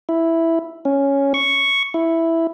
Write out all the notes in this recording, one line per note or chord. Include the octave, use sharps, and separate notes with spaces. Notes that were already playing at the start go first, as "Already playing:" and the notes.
E4
C#4
C#6
E4